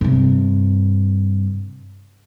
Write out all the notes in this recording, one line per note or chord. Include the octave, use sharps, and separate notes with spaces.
G2 C3